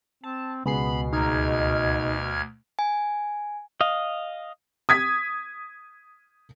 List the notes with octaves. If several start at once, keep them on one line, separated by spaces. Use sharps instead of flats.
C4 A5
C#2 B2 B3 G#4 B5 C7
D2 D#4 F6 G#6
G#5
D#5 F5
D#6 G#6 B6